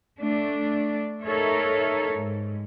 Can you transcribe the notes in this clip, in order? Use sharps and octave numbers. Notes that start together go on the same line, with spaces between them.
A3 D4
D#4 A4 A#4 C#5 E5
G#2